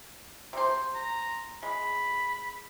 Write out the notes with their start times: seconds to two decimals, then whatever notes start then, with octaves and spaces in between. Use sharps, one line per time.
0.53 C3 C5
0.95 A#5
1.63 G#3 B5